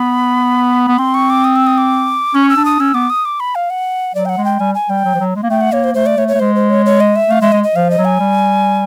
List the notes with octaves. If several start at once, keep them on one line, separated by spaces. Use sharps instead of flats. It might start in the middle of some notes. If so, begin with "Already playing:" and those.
Already playing: B3 B5
B3
C4 C6
C#6
D6
D#6
E6
D#6
D6
C#4 C#6
E6
D4
D#6
C#4 E6
B3 D6
D#6
D6
B5
F5
F#5
F#3 D5
G5
F#5
G#3
G5
G3 G#5
G#5
G3 G5
F#3
F3
F#3
G#3
A#3
A3 G5
F#5
A#3 C#5
C5
A3 C5
D5
A3 C#5
C#5
A3
G#3 C5
C5
C#5
C#5
D#5
E5
A3 F5
G#3 E5
G#3 D#5
D#5
F3 F5
D#5
F#3
G#5
G3